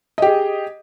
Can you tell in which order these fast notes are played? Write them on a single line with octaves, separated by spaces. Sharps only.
D#5 G4 G#4